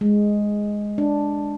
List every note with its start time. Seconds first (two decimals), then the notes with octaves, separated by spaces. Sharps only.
0.01 G#3
0.98 D4